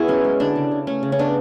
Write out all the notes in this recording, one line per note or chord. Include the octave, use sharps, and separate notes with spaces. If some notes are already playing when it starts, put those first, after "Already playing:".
Already playing: B3 E4 F#4 G#4
F#3 C#4
G#3
D3 D4
C#3
C#3
A3 C#4
C#3
C#4
B3 D4